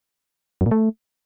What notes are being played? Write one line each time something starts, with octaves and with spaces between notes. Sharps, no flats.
F#2
A#2
A3